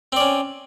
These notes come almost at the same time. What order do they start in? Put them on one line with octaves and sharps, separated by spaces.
C4 D5 C#4